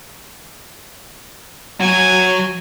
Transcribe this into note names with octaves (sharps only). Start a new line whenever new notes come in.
F#3 F#4 G#5